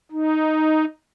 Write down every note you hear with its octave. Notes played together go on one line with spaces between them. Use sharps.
D#4